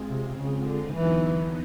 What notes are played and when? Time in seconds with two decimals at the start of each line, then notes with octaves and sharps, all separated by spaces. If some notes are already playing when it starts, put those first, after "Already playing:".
Already playing: G#3 C4 F4 G#4
0.09 C3
0.38 C#3
0.65 D3
0.93 D#2 D3 E3 F#3 B3 D#4